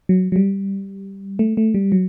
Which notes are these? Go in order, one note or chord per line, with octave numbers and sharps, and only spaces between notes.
F#3
F#3
G3
A3
A3
G3
F#3